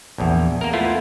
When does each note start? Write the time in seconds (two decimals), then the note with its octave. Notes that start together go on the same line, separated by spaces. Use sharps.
0.18 A#1 E2
0.61 A#3 A#4
0.73 A3 B3 E4 F4